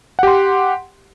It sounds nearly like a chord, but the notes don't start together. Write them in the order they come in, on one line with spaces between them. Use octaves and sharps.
F#5 G4 C6